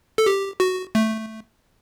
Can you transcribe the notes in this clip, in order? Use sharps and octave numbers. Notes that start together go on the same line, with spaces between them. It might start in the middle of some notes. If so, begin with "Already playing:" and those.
A4
G4
F#4
A3